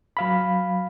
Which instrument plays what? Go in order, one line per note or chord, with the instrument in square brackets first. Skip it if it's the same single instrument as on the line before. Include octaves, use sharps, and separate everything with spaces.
[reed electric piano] F#3 F5 B5